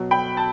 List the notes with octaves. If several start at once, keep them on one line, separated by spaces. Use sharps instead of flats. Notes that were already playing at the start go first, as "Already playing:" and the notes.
Already playing: B2 F#3
G5 B5
A5